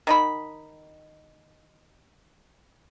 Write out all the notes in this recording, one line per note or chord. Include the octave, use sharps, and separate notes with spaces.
D#3 D#4 B5